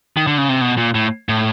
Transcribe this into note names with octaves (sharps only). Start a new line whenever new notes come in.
D#3
D3
C#3
C3
B2
A#2
A2
A2